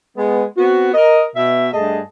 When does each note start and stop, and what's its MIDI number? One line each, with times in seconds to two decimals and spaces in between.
0.17 0.43 56
0.17 0.43 59
0.58 0.92 59
0.58 0.92 60
0.58 0.92 66
0.94 1.23 70
0.94 1.23 75
1.36 1.68 47
1.36 1.68 76
1.74 2.00 43
1.74 2.00 57
1.74 2.00 68
1.74 2.00 75
1.74 2.00 81